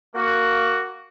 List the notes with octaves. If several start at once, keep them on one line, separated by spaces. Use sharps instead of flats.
A#3 F#4